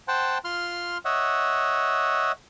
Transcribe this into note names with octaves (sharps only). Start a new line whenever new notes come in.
C5 F#5 G5 A5
F4 C6 F6
C#5 D#5 E5 F#5